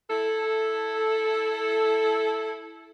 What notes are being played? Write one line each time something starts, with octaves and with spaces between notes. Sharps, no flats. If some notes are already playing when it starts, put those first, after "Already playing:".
E4 A4